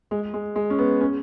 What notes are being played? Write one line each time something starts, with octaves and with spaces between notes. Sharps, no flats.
G#3
G#3
G#3
C#4
B3
C#4